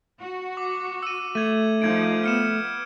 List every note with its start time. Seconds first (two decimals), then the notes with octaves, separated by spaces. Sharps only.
0.20 F#4
0.57 D6
1.03 E6 D#7
1.35 A3 G#6 D#7
1.82 F3 D#4 G6 G#6 D7
2.24 B3 F6 C#7 E7